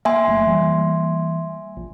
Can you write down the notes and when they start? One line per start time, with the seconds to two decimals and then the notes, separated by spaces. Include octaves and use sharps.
0.05 A#3 E5 G#5 C6
0.27 F#1 F#3 A3
0.46 E3 G3 A#3
1.77 A#1